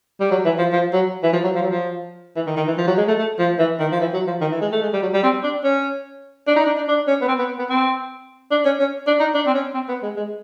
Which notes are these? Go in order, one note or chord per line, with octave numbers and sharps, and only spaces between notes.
G3
F#3
E3
F3
F3
F#3
E3
F3
F#3
F3
F#3
F3
E3
D#3
D#3
E3
F3
F#3
G#3
A3
A3
F3
E3
D#3
F3
E3
F#3
F3
D#3
E3
G#3
A3
G#3
G3
F#3
G3
C4
D4
C#4
D4
D#4
D4
D4
D4
C#4
B3
C4
B3
B3
C4
D4
C#4
C#4
D4
D#4
D4
C4
C#4
C4
B3
G#3
G#3